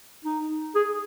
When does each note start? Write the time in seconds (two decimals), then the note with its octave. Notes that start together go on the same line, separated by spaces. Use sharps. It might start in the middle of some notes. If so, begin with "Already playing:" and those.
0.25 D#4
0.75 G#4